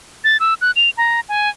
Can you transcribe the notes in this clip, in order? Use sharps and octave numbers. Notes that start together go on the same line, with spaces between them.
A6
E6
F#6
F7
A#5
G#5